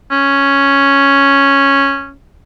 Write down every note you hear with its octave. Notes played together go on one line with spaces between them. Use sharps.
C#4